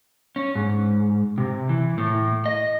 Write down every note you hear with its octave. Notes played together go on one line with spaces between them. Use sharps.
C#4
G#2
C3
E3
A2
D#5